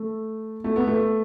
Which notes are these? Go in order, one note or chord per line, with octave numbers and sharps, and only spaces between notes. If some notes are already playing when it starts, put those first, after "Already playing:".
Already playing: A3
A3
B3
A3